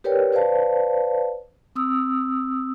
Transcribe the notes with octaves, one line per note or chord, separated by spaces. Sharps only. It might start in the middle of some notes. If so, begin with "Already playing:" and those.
G4 A#4 B4 C#5 D5 G5
B4 C5 D5 F5 A5
C4 D#6 E6